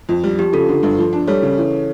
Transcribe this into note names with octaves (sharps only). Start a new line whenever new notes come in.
F2
G3
F3 G4
C#3 F4 A4
D3
G2
F3
D4
G3 A4 C#5
C#3
E3